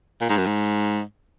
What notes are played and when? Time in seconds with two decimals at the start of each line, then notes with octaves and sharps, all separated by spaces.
0.21 A#2
0.29 G#2
0.37 F#2
0.46 G#2